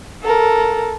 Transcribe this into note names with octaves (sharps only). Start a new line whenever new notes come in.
A4 A#4